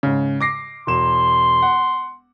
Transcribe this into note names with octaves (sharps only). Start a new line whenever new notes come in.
G#2 C#3
D6 A#6 C7
E1 C6 E7
F#5